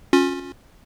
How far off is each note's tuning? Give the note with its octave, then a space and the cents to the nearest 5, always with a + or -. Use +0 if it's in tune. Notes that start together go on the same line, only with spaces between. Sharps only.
C#4 +0 F4 +35